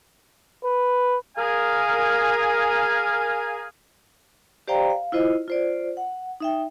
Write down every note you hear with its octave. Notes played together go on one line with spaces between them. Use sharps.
B4
G#4 A#4 F5 G#5
G4 C5 D5 F5 G5 A#5
F5
E4 F4 C5 D#5
F4 C5 D5
F#5
D#4 E5 G5